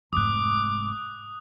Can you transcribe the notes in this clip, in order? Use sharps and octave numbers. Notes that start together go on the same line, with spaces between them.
F1 G#2 D6 D#6 F#6